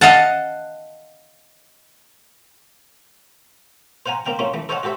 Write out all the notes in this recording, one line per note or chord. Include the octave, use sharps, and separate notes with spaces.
D#5 F5 F#5 A5
C5 F5 F#5 G#5 A#5
A#3 C4 F5 G5
A3 A#3 C4 C#4 F4
E3 A3
A4 C5 C#5 D#5 F5 F#5
F#4 G4 A4 C5 E5